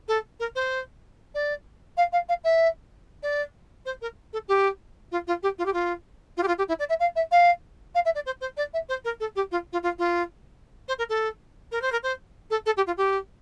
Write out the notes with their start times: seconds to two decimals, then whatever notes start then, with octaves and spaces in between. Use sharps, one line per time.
0.08 A4
0.40 A#4
0.55 C5
1.35 D5
1.97 F5
2.13 F5
2.29 F5
2.44 E5
3.23 D5
3.86 C5
4.02 A#4
4.33 A4
4.48 G4
5.12 F4
5.27 F4
5.43 G4
5.58 F4
5.66 G4
5.73 F4
6.37 F4
6.43 G4
6.48 F4
6.58 G4
6.68 E4
6.79 D5
6.89 E5
7.00 F5
7.16 E5
7.31 F5
7.95 F5
8.05 E5
8.15 D5
8.26 C5
8.41 C5
8.57 D5
8.74 E5
8.89 C5
9.05 A#4
9.20 A4
9.36 G4
9.52 F4
9.73 F4
9.83 F4
9.99 F4
10.88 C5
10.99 A#4
11.09 A4
11.72 A#4
11.82 C5
11.92 A#4
12.03 C5
12.51 A4
12.66 A4
12.77 G4
12.87 F4
12.97 G4